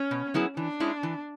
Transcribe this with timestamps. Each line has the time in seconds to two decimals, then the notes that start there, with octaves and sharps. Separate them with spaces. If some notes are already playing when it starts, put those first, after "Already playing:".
Already playing: C#4
0.11 B2
0.34 F#3 B3 E4 G#4
0.56 E3 D4
0.80 G#3 C#4 E4
1.03 E3